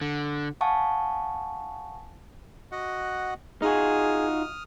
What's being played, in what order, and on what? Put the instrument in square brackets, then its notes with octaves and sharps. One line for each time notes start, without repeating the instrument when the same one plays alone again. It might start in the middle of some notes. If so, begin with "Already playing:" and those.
[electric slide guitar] D3
[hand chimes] F5 F#5 G#5 A5 C#6 D#6
[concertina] F#4 D#5 F#5
[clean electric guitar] D#4 F4 F#4 [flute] G#4 [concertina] D#6 F6